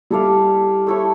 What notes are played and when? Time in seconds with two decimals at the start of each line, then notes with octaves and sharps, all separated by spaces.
0.10 G3 E4 A4 D5 F5
0.87 A3 E4 A4 C#5